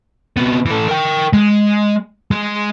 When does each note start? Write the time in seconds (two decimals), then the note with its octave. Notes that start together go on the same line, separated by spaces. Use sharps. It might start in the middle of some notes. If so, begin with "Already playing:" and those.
0.37 C3 B3
0.66 E3 A4
0.88 A#4 G5
1.33 G#3
2.31 G#3